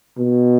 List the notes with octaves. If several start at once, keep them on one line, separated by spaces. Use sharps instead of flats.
B2